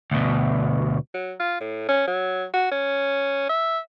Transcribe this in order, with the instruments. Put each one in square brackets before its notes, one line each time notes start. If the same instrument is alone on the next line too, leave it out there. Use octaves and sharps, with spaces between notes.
[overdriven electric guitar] D2 B2
[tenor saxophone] F#3
F4
A2
C#4
F#3
F#4
C#4
E5